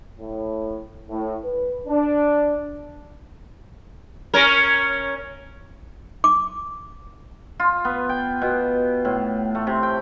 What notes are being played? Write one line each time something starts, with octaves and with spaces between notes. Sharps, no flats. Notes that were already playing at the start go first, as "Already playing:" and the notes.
A2
A2
B4
D4
C#4 A#4
D6
F4
B3
G5
B2
A2
A3
C3
G5